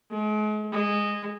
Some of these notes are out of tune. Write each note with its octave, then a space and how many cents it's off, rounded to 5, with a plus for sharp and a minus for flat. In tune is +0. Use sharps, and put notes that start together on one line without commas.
G#3 +40
G#3 -15